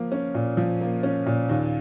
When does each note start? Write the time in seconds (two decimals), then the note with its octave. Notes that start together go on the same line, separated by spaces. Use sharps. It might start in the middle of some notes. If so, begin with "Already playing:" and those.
Already playing: F3 A#3
0.12 C#4
0.35 A#2
0.57 F3
0.81 A#3
1.03 C#4
1.26 A#2
1.49 D#2